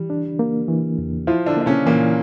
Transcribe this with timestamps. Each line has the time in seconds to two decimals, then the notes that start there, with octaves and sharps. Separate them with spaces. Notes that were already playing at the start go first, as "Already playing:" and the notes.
Already playing: E3 G3
0.10 D4
0.39 A#3
0.68 E3
0.98 E2
1.27 F3 E4 F4
1.46 D3 D4
1.57 A#3 D4
1.66 C#3 C#4
1.86 A#2 E3 A#3